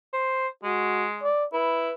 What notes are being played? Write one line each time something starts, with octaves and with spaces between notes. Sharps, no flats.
C5
G#3 F#4
D5
E4 B4